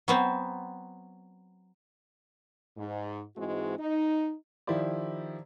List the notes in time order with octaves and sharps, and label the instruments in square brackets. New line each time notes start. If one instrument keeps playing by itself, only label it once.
[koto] F#3 B3 C4
[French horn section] G#2
G#2 E3 G#3 C4 F#4
D#4
[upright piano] D#3 F3 E4 G4 C5 D5